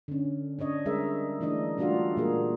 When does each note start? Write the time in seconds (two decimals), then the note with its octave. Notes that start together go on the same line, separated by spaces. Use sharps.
0.08 D3 C#4
0.59 C#4 D4 C#5 D#5
0.85 G3 G#3 G#4 A#4 E5
1.40 E3 A3 D4 D#4 D#5
1.78 G3 A3 D4 F4 F#4 F5
2.17 A#2 G#3 A#3 G#4 A#4